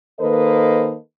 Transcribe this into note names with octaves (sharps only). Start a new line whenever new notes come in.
D#3 A#3 A4 B4 C5 D#5